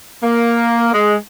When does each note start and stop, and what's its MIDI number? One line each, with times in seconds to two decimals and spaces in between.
0.23 0.91 58
0.93 1.14 56